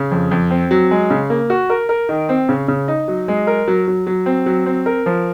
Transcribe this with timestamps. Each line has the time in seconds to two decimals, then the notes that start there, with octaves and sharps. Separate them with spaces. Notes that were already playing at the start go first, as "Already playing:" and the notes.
Already playing: C#3
0.11 F2
0.31 F2
0.51 C4
0.71 F#3
0.91 G#3
1.10 C#3
1.30 A#3
1.50 F#4
1.70 A#4
1.89 A#4
2.09 D#3
2.29 C4
2.49 C#3
2.68 C#3
2.88 D#4
3.08 F#3
3.28 G#3
3.47 A#4
3.68 F#3
3.88 F#3
4.07 F#3
4.26 C4
4.46 F#3
4.66 C4
4.86 A#4
5.06 F3